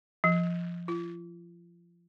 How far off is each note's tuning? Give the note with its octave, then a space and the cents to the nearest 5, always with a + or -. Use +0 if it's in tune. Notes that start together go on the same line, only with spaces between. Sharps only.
F3 -15
F4 -35